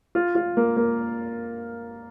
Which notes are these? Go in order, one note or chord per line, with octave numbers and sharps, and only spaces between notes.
F4
F4
A#3
A#3